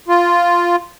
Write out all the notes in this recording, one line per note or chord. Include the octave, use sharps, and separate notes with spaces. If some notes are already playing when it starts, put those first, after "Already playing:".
F4